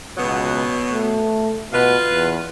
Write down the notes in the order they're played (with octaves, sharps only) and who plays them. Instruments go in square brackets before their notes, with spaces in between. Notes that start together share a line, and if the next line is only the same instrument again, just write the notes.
[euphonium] C#2 [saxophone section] B2 F#3 B3
[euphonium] A3
[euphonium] B2 [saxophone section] F4 B4
[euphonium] E2